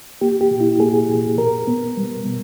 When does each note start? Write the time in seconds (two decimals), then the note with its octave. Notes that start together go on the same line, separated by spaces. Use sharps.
0.21 A#3 G4
0.41 G4
0.51 A#2
0.60 E4
0.80 A#3 G#4
1.09 A#2
1.38 B2 A#4
1.67 B3
1.97 G3
2.26 B2